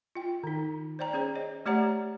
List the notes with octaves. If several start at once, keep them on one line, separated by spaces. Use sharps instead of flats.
F4 G5
D#3 D#4
C5 D5 G5 A#5
C#4 G#4 C5 C#5
D#5
A3 G4 C#5 D5 F#5 A#5